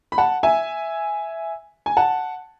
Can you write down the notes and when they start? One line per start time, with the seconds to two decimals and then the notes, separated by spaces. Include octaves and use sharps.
0.12 B5
0.18 F#5 A5
0.43 E5 G#5
1.86 G#5
1.97 F#5 A5